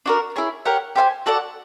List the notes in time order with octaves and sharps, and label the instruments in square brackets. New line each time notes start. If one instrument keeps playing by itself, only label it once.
[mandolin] D4 F#4 A#4
E4 G#4 C#5
G4 A#4 C#5 F#5
G4 C5 F5 G#5
F#4 A4 D5 F#5